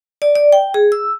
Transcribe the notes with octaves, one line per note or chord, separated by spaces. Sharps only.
D5
D5
G5
G#4
E6